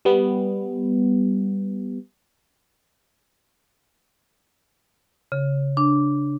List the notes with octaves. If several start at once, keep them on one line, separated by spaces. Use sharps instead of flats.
G3 B3
C#3
D4